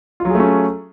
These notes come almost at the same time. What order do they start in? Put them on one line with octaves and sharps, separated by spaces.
F4 F#3 G#4 A3 C#4